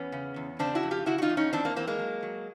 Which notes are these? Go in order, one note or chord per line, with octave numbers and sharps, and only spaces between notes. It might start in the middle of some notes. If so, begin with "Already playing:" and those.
Already playing: E2 B3 C#4
C#3
E2
C#3 C4 D4
E4 F#4
F2
F4 G4
C#3 E4 F#4
F#4
D#4 F4
E2
C#4 D#4
E3 C4 D4
A#3 C4
E3 A#3 C4
G#3 A#3
F#3
F#3